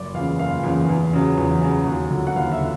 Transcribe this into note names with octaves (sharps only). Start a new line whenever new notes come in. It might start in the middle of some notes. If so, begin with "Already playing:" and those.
Already playing: F#1 D5
E2 C#3 F5
F#1 F5
E2 C#3
E2
C#3 F#3
E2
C#3 F#3
D#2
D3 F#3
F#5
D#2 F5
E5
D3